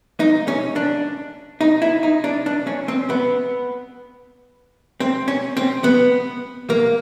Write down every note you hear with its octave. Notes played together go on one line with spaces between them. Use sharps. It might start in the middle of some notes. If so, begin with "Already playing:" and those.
D#4
C#4
D4
D#4
E4
D#4
D4
D4
C#4
C4
B3
C4
C#4
C4
B3
A#3